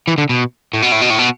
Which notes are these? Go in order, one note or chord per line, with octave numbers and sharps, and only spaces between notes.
E3
D3
B2
A2
B2
A2
B2
A2
B2